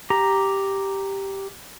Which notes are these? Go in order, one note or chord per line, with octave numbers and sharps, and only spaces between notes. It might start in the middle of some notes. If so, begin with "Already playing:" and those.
G4 A#5